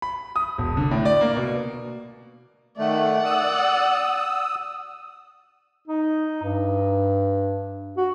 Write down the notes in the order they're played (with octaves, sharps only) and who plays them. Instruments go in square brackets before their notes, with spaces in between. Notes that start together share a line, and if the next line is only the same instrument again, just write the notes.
[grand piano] B5
D#6
E1
D3
A2
D5
A#3
B2
[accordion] D#3 A3 [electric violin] D5 F#5
[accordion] D#6 E6
[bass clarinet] D#4
G2
F#4